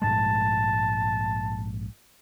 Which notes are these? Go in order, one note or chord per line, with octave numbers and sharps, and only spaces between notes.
A#1 G#2 G#3 A5